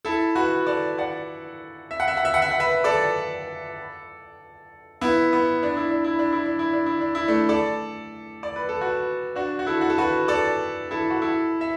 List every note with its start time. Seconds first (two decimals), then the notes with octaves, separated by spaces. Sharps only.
0.05 E4 A4
0.35 F#4 B4
0.66 A4 D5
0.98 D5 F#5
1.91 E5
2.00 F#5
2.08 E5
2.17 F#5
2.25 E5
2.34 F#5
2.42 E5
2.51 F#5
2.60 B4 E5
2.84 A4 D5
5.01 B3 E4
5.33 B3
5.63 D4
5.77 E4
5.91 D4
6.04 E4
6.19 D4
6.32 E4
6.46 D4
6.59 E4
6.73 D4
6.86 E4
7.01 D4
7.15 E4
7.28 A3 D4
7.49 A4 D5
8.43 D5
8.56 B4
8.69 A4
8.81 F#4 B4
9.36 D4 F#4
9.59 F#4
9.67 E4 A4
9.81 F#4
9.90 A4
9.98 F#4 B4
10.28 A4 D5
10.91 E4 A4
11.10 F#4
11.22 E4 A4
11.61 E5